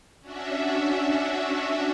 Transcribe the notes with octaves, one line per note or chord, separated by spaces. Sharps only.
C#4 D4 F#4 E5